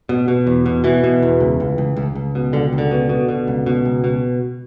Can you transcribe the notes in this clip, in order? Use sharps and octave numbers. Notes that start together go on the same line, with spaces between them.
B2
B2
E2
B2
B2 E3
B2
E2
C#2
C#2
C#2
C#2
C#2
B2
C#2 D3
C#2
D3
B2
B2
B2
C#2
B2
C#2
B2